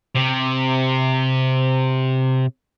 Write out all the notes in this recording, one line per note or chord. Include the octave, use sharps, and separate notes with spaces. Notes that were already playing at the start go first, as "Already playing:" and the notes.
C3